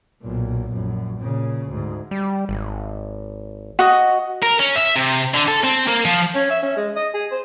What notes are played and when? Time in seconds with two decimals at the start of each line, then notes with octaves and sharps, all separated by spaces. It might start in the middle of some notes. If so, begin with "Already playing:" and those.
0.22 B1 A#2
0.73 A#1 F#2
1.22 A#2 C#3
1.69 D2 G#2
2.11 G3
2.49 G#1
3.79 F#4 D#5
4.43 A#4
4.59 C#4
4.76 E5
4.96 C3
5.34 D3
5.48 A4
5.64 C4
5.88 A#3
6.05 F3
6.35 C#4
6.50 E5
6.63 C#4
6.76 G#3
6.96 D#5
7.14 G#4
7.31 C5